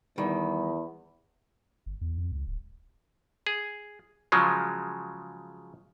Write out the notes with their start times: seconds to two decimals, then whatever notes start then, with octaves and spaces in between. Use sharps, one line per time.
0.18 E2 D#3 G3 B5
1.86 G1
2.01 E2
2.18 F2
2.32 C#2
2.47 D1
3.47 G#4
4.32 C#3 F3 F#3 G#3